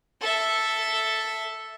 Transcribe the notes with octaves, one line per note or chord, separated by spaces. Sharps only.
A4 E5